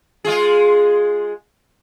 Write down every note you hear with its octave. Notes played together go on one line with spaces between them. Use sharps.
G#3 F4 G#4